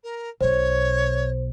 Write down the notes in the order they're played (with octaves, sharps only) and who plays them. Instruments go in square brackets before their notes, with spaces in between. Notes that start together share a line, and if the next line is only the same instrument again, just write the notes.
[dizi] A#4
[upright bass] B1 B2 [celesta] C5 [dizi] C#5